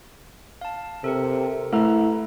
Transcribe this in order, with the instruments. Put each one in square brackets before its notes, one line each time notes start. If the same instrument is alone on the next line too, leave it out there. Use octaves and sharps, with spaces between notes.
[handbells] F5 A5
[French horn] C3 [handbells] A4 A#4 C#7
[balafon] A3 [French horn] E4 [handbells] A4 B4 A#5